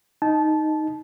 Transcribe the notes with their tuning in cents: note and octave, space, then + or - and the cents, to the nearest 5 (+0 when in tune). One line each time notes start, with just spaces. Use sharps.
D#4 +0 A5 -20